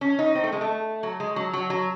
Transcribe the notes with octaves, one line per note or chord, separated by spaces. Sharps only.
C#4
D#4
C4
A3
G#3
A3
F#3
G#3
F#3
F#3
F#3